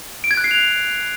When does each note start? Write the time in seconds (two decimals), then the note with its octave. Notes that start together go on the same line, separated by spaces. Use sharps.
0.24 D7
0.31 G#6
0.37 F#6
0.44 C7
0.51 F7